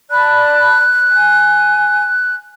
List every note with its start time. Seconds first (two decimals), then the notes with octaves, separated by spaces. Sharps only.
0.11 D5 A5 B5 F#6
1.11 G#5